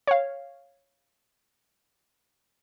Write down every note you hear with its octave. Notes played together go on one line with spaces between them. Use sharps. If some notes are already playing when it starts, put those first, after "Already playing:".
C#5 F5